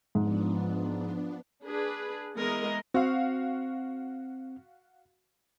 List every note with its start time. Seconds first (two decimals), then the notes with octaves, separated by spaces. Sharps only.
0.15 G#2 F3 B3 D4
1.64 D4 G#4 B4
2.36 E3 G#3 B3 A#4 D#5
2.94 C4 F#4 F5